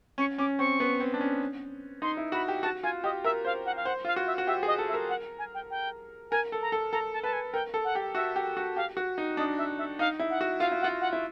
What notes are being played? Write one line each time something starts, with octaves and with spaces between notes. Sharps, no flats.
C#4 C#6
C#4 D6
C4 C#6
B3
C4
D4
C#4
D#4 C6
E4
F#4 B5
G4
F#4 A5
F4 G#5
G4 D#5
A#4 E5
C5 F5
F#5
F5
C5 F#5
F4 F5
F#4
E5
F#4
G4 E5
G#4
D#5
A4
E5
A#4
F#5
G#5
G5
G5
A#4 G#5
A4
A#5
A4
A4 A#5
A5
B4 A5
G#5
A#4 G5
A4
F#5
G4
F#4 E5
G4
F#4
G4 F5
F#4
D#4
D4 D#5
E5
E5
D#4 F5
E4
F#5
F#4
F4 F5
E4
F#5
F4
F#5
E4